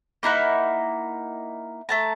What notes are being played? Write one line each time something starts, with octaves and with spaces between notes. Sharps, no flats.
A#3 D#4 E4 F#5
A3 A5 A#5